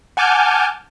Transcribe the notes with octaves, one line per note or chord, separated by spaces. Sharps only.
F#5 G#5 A5 D6 F6 G6